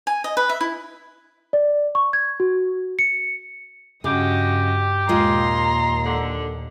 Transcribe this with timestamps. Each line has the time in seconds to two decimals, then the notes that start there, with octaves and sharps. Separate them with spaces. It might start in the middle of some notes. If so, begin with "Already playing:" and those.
0.07 G#5
0.24 D#5
0.37 B4
0.49 E5
0.61 E4
1.53 D5
1.95 C#6
2.13 G#6
2.40 F#4
2.99 C#7
4.04 G2 C#3 F#4 G4 D#5
5.09 D#2 A#2 G#3 F4 D#5 A#5 C6
6.05 D3